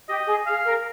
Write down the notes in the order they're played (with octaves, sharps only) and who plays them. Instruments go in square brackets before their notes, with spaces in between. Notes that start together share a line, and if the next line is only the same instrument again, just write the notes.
[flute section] G4 [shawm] D#5
[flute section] G#4
[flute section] G#4 [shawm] F5
[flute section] A#4